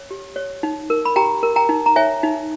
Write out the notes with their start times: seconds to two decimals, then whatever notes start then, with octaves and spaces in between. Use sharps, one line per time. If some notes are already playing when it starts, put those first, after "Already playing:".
Already playing: C#5
0.11 G4
0.36 C#5
0.63 D#4
0.90 A#4
1.05 B5
1.16 G4 G5 A#5
1.43 A#4
1.56 G5 A#5
1.69 D#4
1.86 A#5
1.96 C#5 E5 G#5
2.23 D#4